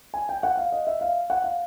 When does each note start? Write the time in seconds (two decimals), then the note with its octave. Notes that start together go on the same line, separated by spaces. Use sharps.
0.14 G#5
0.29 G5
0.43 F#5
0.57 F5
0.72 D#5
0.87 E5
1.01 F5
1.30 F#5
1.44 F5